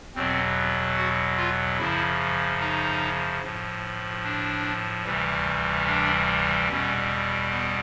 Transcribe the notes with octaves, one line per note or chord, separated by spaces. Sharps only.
E2 B2 F#3 C4
F#4
F4
F#2 C#3 F3 E4
D#4
A2 F3
D4
D2 C3 E3 G3
D4
E2 B2 G3 C#4
B3